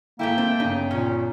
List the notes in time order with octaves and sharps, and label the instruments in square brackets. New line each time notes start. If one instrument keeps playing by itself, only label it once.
[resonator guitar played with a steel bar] G#2 A3 E4 [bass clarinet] A#3 [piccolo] G5
[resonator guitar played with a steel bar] A3 [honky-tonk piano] C4
[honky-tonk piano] G1 C#3 [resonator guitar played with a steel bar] D#4
[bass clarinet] A#2 [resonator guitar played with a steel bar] C#4